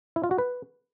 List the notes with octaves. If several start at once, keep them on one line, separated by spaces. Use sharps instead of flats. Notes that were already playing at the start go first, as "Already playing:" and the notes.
E4
F4
F#4
B4